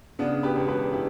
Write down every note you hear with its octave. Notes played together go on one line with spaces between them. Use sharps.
C#3 B3 D4
G4 B4
E1
G4 B4
E4 G4